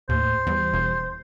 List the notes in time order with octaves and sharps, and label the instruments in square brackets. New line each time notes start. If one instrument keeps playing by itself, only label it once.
[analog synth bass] D#2 [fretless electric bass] A2 [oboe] C5
[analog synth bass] E2 [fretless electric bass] E3 G3
[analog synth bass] E1